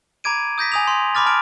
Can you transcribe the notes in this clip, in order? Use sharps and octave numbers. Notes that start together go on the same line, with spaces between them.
A#5 B5 D6 G#6 D7 D#7
D#6 G6 A#6 B6
G#5 D#6 F7
C6
B5 C6 D6 F6 A6
A5 F6 D7